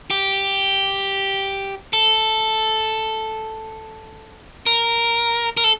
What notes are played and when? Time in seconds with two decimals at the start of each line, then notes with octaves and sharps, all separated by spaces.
0.10 G4
1.93 A4
4.66 A#4
5.57 A#4
5.64 A4